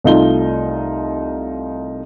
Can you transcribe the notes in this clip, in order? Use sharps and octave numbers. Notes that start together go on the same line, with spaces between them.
C2 A3 D#4 F4 G7